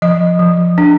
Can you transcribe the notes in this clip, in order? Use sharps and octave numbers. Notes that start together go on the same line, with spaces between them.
F3 D#5
F3
D4